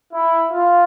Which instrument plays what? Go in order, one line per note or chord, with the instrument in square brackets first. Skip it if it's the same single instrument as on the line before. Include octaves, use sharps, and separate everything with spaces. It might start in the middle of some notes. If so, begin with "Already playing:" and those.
[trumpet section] E4
F4